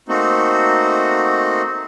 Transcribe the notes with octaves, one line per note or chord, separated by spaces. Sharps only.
A3 A#3 C4 D#4 F#4